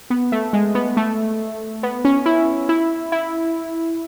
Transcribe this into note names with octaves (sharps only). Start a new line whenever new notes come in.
B3
A3
G#3
B3
A3
B3
C#4
E4
E4
E4